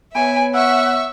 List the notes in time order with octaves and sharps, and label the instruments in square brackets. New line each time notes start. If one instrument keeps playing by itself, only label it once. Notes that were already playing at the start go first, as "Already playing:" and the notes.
[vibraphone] B3 C#5 [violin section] B4 E5 [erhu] G#5 [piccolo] D7
[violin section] E5 C#6 [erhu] F#5 [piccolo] E6